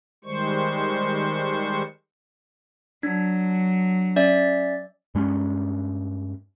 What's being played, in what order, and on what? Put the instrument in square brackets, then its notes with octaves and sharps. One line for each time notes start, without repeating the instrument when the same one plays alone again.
[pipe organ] D#3 G3 G#3 C5 C#6
[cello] F#3 [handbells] D4
[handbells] C#4 D5 E5
[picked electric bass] G2 G#3 C4 C#4